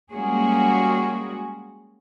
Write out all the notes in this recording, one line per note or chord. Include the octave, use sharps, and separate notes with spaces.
G3 G#3 A#3 C#4 F#4 G#4